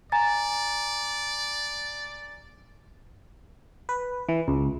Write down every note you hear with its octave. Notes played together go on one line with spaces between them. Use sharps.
D5 G#5 A#5 A6
B4
E3
C#2